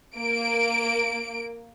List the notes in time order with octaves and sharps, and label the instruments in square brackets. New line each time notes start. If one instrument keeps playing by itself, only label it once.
[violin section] A#3 D7